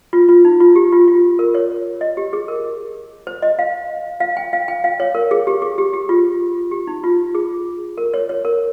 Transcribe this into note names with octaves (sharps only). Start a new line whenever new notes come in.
F4
F4
D#4
F4
G4
F4
F4
A#4
C#5
D#5
G4
G#4
A#4
C5
D#5
F5
F5
G5
F5
G5
F5
C#5
A#4
G#4
G4
G#4
G4
G4
F4
G4
D#4
F4
G#4
A#4
C#5
C#5
A#4